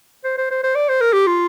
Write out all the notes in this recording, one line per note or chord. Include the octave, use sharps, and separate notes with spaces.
C5
C5
C5
C5
D5
C5
A#4
G4
F4